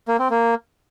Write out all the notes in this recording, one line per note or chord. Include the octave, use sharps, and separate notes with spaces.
A#3
C4
A#3